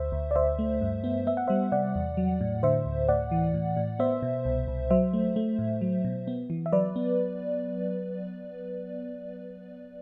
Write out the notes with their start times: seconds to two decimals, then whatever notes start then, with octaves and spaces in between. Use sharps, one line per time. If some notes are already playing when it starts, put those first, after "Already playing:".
Already playing: D2 C5 E5
0.12 D2
0.31 D5
0.36 D2 C5 E5
0.59 A3
0.81 G2
1.04 B3
1.27 B3 E5
1.37 F#5
1.47 G3 C5 E5
1.72 C3 D5 F#5
1.95 E2
2.17 F#3
2.41 A2
2.63 D3 C5 E5
2.86 D2
3.08 A2 D5 F#5
3.31 E3
3.54 A2
3.77 A2
3.99 B3 C5 E5
4.22 B2
4.45 C2
4.68 C2
4.90 F#3 C5 E5
5.13 A3
5.36 A3
5.59 A2
5.81 F#3
6.04 B2
6.27 B3
6.50 E3
6.66 E5
6.72 F#3 B4 D5
6.96 B3